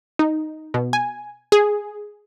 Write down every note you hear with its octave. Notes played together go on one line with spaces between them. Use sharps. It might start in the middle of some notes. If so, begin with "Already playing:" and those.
D#4
B2
G#5
G#4